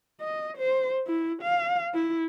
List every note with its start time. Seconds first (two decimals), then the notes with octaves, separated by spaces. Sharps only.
0.21 D#5
0.58 C5
1.07 E4
1.42 F5
1.94 E4